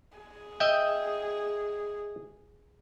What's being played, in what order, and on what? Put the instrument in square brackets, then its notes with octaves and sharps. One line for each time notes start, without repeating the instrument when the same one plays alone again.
[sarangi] G#4
[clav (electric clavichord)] D#5 E5 G5